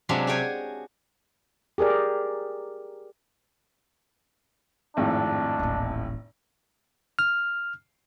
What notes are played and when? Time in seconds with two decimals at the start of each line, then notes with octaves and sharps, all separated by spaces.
0.09 C3 F#3 G#3 D4 F4
0.27 F#4 G#4 C#5 G5 G#5
1.78 G4 G#4 A#4 D5
4.97 G#1 F2 A2 D4
5.59 D#1 A1
7.19 F6